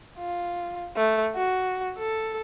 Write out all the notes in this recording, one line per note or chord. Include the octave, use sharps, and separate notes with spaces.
F4
A3
F#4
A4